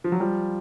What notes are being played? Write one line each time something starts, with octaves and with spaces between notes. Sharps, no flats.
F3
F#3
F3 G3